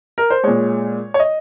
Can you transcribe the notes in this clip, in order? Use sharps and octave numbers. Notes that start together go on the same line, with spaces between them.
A#4
C5
A#2 G#3 C#5
C#5
D#5